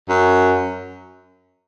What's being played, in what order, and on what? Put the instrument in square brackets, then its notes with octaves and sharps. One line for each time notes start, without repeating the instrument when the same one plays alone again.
[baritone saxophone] F#2